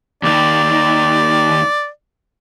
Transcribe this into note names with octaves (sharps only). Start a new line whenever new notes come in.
D#2 D#3 D5